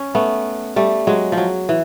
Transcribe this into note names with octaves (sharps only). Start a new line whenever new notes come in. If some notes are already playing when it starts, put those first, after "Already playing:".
Already playing: C#4
A3 B3
G3 A3
F#3 G#3
F3
F#3
E3